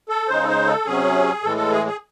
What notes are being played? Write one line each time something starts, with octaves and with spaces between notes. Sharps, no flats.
A4
C#3 G#3 D#4 C5
A4
C5
A4
C3 F#3 C#4 G#4
A2 E3 G#3 A4
A4
G#4
G#4